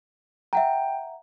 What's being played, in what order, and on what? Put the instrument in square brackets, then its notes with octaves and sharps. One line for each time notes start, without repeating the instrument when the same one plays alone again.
[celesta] E5 F#5 A#5 [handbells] G5